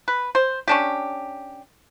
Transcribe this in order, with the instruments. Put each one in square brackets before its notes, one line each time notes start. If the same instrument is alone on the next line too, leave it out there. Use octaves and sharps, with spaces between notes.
[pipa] B4
C5
C#4 D4 G4